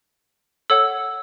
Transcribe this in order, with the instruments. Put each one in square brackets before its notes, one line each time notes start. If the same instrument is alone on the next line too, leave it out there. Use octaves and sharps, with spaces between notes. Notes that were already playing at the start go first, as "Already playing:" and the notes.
[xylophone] A4 C#5 F#5 E6